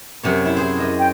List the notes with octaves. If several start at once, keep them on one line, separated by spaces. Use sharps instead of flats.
F#2 C3 C#5
E4
G#4 C5
F#2 D#5
G5